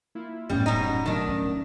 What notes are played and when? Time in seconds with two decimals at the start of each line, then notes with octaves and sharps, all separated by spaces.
0.15 A#3 E4 F4
0.50 D#1 F#2 A2 G3 B3 C#4
0.66 B2 D#4
1.06 B2 D#3 F#3 A3 D4
1.26 D3 C#4